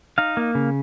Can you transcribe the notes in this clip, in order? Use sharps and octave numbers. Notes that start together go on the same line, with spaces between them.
D#4 F5
A#3
C#3